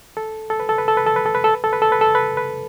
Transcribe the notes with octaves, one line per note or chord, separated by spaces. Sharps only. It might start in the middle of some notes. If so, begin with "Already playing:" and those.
A4
A4
B4
A4
B4
A4
B4
A4
B4
A4
B4
A4
B4
A4
B4
A4
B4
A4
B4
B4